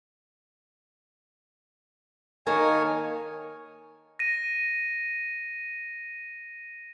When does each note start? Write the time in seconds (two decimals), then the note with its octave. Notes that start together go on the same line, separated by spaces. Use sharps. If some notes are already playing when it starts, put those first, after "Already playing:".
2.46 D#3 A#3 A#4 C#5 G#5 A5
4.19 A#6 D#7